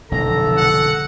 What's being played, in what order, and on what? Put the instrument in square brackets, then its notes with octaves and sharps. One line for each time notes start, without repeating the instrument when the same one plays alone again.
[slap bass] F1 B1 [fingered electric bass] B2 D3 G#3 [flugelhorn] A4 [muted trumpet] A#5
[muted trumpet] F#5